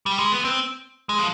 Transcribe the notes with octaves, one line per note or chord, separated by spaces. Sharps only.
G3
G#3
B3
C4
G#3
F3